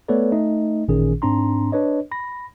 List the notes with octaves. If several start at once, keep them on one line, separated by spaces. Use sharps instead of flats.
A3 B3 A4 B4 C#5 D5
A3 D#4 D#5
A1 A#2 D#3 C#4 G#4
G#2 C4 D4 A#5 C6
D4 B4 C#5 D#5
B5 A#6